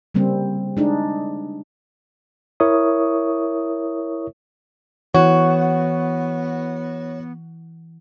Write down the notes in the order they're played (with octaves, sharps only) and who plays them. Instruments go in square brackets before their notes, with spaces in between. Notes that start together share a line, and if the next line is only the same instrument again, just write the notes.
[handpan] C#3 G3 A#3 C4
G#3 D4 D#4
[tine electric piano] E4 A#4 C#5 E5 C#6 D#6
[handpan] E3 [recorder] B3 [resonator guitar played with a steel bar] F#4 [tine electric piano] C#5